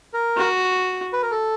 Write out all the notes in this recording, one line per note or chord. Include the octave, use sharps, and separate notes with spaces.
A#4
F#4
B4
A#4
A4